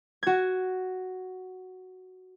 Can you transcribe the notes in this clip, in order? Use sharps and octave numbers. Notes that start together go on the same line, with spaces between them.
F#4 G#6